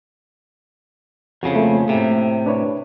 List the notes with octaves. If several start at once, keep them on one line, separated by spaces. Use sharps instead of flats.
F2 C#3 F#4
A3 A#3
A2 C3
D4 B4 C#5